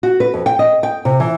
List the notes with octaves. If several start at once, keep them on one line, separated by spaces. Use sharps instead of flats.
F#4
B4
F2
G5
D#5
G5
C3
E3